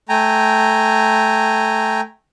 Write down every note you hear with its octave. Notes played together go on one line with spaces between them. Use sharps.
A3 G5 G#5 A#5